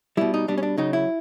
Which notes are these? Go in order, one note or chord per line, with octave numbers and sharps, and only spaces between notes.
B2 G3 E4
D#4
B2 G3 D4
C#4
D4
C#3 F#3 D#4
E4